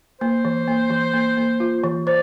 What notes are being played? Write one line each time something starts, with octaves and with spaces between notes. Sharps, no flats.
A#3 C5
E3
A#3
E3
A#3
A#3
F4
E3
C5 D5